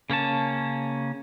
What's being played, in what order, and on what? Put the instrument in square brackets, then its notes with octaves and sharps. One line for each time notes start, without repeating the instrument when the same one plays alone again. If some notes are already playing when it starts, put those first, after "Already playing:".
[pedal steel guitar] C#3 A#3 C#4 A5